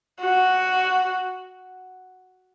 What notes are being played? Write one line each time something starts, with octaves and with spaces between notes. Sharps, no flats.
F#4